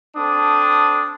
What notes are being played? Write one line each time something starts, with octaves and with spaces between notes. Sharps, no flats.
C4 D4 A4 D#6